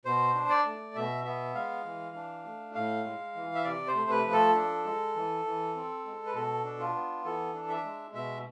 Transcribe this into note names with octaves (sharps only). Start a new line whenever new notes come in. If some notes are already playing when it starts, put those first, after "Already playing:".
B2 C5
D4
D5
A3
B2 E5
B3 E5
G#3 F5
E3
D4
A3
A2 F5
G#3
E3
E5
C3 D5
C5
A3
B4
F3
A4
D4
G#3
E3
E3
C4
G#3
B4
B2 A4
D4
F4
B3
E3 A4
D4
E5
G#3
B2 E5